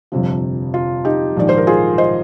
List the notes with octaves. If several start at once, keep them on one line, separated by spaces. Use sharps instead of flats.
G1 F2 C3 F3
F4
D#4 G4
A#1 G#2 D#3 D5
C5
A#4
F4 G#4
C5 D#5